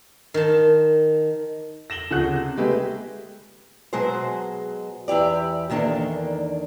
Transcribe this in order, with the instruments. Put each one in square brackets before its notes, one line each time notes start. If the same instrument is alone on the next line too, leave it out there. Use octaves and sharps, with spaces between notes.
[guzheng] D#3 A5
[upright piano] A#6 E7 F#7 G7
D2 F3 C#4 G#4 F#5 F#6
C3
G#3 A3 G4 G#4 B4 E5
[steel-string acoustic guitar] B2 F#3 G#3 G#4 C5
E2 E4 G4 D5
E2 D#3 A#3 D4 A4